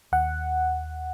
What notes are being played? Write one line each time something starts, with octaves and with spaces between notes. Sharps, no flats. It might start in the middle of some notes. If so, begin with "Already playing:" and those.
D#2 F#5